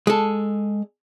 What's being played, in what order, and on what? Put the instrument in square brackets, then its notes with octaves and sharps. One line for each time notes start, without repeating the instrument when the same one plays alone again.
[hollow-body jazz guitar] G#3 A4